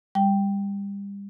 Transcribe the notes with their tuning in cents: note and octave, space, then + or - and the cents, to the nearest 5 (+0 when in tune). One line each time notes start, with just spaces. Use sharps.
G3 +30 G5 +0